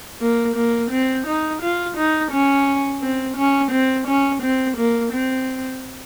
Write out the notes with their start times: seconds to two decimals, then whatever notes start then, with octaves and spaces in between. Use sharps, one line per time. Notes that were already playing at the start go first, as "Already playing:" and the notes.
0.21 A#3
0.56 A#3
0.91 C4
1.27 D#4
1.62 F4
1.97 D#4
2.31 C#4
3.02 C4
3.36 C#4
3.72 C4
4.07 C#4
4.42 C4
4.77 A#3
5.13 C4